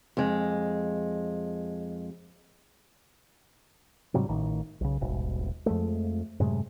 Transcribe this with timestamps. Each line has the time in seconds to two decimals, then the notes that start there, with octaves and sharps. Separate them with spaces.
0.17 F2 G#3
4.14 G#2 C3 F#3 G3
4.28 A1 A2 D#3
4.81 B1 C#3
5.01 D#1 G#1 B2
5.66 F2 F3 G#3 A3
6.40 F#2 A2 C3 G#3